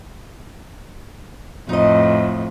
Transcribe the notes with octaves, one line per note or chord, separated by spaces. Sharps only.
F2 A2 D#4 D#5